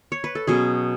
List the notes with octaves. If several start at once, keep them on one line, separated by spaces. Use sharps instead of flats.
C#5
B4
A4
B2 F#3 C#4 G#4